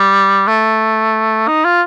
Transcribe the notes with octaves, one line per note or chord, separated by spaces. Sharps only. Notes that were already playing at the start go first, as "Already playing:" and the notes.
Already playing: G3
A3
D#4
F4